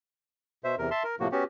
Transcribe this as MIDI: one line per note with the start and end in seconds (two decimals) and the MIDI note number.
0.64 0.75 47
0.64 0.75 72
0.64 0.75 76
0.78 0.89 40
0.78 0.89 48
0.78 0.89 70
0.91 1.03 76
0.91 1.03 81
0.91 1.03 84
1.04 1.15 70
1.20 1.28 45
1.20 1.28 48
1.20 1.28 53
1.20 1.28 58
1.20 1.28 66
1.32 1.44 59
1.32 1.44 61
1.32 1.44 66
1.32 1.44 67